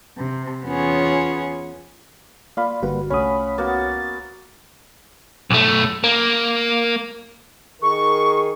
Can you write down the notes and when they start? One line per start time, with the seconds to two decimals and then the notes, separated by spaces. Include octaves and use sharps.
0.17 C3
0.65 E2 B3 C#4 F4 G#4 C#5
2.57 A#3 F4 D5 F5 B5
2.83 G1 D3 G3 A#3 F#4 B4
3.10 C2 A3 C#4 C#5 F#5 B5 D#6
3.58 A#3 B3 F#4 A6
5.50 B1 A3
6.04 A#3
7.82 D#3 G#4 A#4 C#6